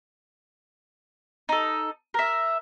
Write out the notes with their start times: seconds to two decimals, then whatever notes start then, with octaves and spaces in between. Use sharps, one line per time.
1.49 D#4 A4
2.14 A#4 E5